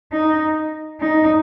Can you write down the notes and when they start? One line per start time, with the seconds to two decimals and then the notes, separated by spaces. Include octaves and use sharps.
0.12 D#4
1.00 D#4